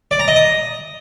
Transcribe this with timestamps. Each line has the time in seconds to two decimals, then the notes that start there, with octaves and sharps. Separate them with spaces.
0.11 D5
0.19 A#5
0.28 D#5
0.36 D#6